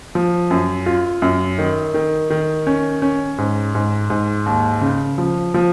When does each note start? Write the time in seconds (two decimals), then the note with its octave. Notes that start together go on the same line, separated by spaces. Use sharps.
0.15 F3
0.51 F#2
0.86 F4
1.22 F#2
1.58 D#3
1.94 D#3
2.30 D#3
2.67 C#4
3.02 C#4
3.38 G#2
3.75 G#2
4.10 G#2
4.46 D#2
4.81 C#3
5.18 F3
5.54 F3